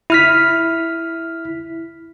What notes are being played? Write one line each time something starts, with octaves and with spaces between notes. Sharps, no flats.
E4 F6 B6